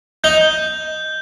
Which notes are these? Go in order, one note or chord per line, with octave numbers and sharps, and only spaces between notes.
D#4 G6
G6